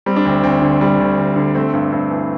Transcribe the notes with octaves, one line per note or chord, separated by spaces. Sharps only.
G3 C4
D4
D2 C4
D2 C4
D3
G3
D2
D2
D3
A3 C4
G2
G2 C4
E3